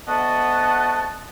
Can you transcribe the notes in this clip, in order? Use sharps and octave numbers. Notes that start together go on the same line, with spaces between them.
D2 B3 F#4 D#5 A5